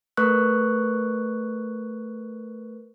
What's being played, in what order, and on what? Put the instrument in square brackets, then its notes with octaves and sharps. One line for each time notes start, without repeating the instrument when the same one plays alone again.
[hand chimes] A3 A#4 B4 C#6 F#6